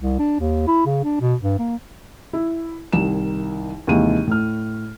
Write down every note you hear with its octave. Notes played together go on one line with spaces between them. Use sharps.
C2
D4
D#2
E4
C#3
D4
B2
G2
A#3
E4
C2 D#3 E7
D#2 C3 E3 G#3 D#7
A2 F6